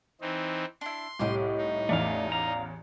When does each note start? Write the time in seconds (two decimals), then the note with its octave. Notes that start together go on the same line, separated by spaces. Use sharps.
0.21 E3 C4 D#4
0.81 D4 E4 C6
1.19 C2 A2 G4 D#5 D6
1.58 D#4
1.89 A1 E2 A3 D5 F5
2.32 F5 A#5